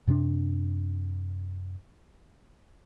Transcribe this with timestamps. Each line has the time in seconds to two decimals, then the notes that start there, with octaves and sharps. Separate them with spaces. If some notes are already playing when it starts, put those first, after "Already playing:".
0.07 F#2 C3 C4 D4